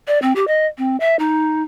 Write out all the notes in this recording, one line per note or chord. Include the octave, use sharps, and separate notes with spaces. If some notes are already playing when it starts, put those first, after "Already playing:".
D5
C4
G4
D#5
C4
E5
D#4